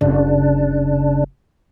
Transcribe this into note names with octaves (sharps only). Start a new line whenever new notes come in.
F#1 C#3 D4